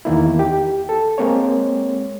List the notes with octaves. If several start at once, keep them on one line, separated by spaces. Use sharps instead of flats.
E2 D#3 A#3 E4
G4
A4
G#3 A#3 C4 C#5